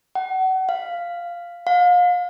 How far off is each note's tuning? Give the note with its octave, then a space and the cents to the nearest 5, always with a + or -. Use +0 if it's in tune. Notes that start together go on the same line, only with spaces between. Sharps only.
F#5 +30
F5 -5
F5 +35